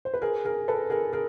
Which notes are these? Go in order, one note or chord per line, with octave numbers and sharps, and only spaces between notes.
C5
B4
G#4 A#4
G#4 A#4
A4 B4
G#4 A#4
G#4 A#4